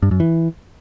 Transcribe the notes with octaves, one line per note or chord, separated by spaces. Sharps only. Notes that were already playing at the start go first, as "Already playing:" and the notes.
G2
F#2
E3